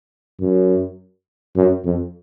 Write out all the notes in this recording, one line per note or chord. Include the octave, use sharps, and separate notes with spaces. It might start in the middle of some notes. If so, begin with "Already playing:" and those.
F#2
F#2
F2